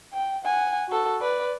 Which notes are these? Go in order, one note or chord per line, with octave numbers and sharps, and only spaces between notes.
G5
F#5 G#5
F#4 A4
B4 D5